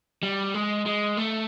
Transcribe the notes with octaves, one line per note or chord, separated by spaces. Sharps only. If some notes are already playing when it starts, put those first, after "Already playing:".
G3
G#3
G#3
A3